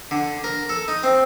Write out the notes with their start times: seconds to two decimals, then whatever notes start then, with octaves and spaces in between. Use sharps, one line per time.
0.11 D3
0.44 A#4
0.69 A4
0.88 D#4
1.03 C4